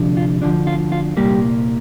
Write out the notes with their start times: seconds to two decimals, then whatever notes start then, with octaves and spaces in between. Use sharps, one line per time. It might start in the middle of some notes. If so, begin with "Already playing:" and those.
Already playing: D2 C3 F3 D4
0.17 F4
0.41 D2 D3 F3 D4
0.67 F4
0.92 F4
1.17 C2 A#2 G3 A#3 G4